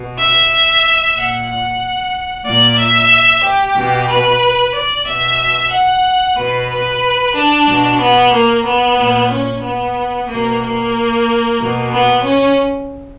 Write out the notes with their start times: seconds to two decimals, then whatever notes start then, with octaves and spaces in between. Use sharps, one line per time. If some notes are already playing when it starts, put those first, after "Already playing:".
Already playing: B2
0.18 E5
1.16 A#2 F#5
1.49 F#5
2.46 A#2 D5
2.79 E5
3.45 G4
3.77 B2
4.09 B4
4.75 D5
5.07 B2 E5
5.72 F#5
6.38 B2 B4
6.70 B4
7.35 D4
7.68 B2
8.01 B3
8.34 A#3
8.66 B3
8.99 A#2
9.31 C#4
9.64 B3
10.29 B2 A#3
10.62 A#3
11.60 B2
11.92 B3
12.24 C#4